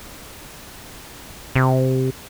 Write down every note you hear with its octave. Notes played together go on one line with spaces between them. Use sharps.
C3